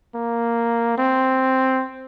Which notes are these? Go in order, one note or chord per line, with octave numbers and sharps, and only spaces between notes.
A#3
C4